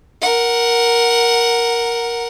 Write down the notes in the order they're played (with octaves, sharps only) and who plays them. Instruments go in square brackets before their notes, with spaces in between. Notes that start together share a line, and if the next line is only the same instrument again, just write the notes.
[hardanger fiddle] A#4 F#5